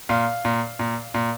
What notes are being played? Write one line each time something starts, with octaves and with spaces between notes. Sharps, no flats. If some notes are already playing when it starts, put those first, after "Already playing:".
A#2 F5
A#2
A#2
A#2